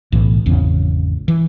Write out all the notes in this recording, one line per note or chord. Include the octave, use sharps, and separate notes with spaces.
B1 A2 E3
G#1 E2 C#3
E3